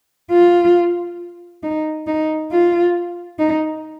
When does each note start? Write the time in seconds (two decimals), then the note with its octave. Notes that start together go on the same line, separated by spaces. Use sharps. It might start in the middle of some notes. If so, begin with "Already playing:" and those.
0.31 F4
1.63 D#4
2.07 D#4
2.52 F4
3.39 D#4